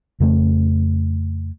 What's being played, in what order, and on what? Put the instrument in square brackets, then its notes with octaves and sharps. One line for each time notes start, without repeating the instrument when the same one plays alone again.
[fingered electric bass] F2 C#3 A3